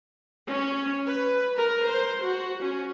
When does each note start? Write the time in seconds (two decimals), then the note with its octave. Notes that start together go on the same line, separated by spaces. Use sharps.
0.46 C#4
1.06 B4
1.56 A#4
1.86 C5
2.22 F#4
2.62 C#4